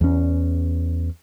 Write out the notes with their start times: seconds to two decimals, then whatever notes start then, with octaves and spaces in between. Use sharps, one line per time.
0.01 E2 C#4